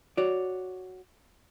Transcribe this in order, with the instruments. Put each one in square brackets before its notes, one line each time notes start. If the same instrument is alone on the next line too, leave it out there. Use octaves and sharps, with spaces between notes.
[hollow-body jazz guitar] F#4 C#5 D5